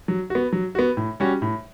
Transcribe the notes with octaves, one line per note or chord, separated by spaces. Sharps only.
F#3
B3 F#4
F#3
B3 F#4
A2
G3 C#4 F#4
A2